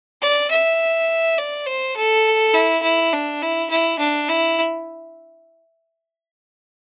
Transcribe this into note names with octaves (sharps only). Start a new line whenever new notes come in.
D5
E5
D5
C5
A4
E4
E4
D4
E4
E4
D4
E4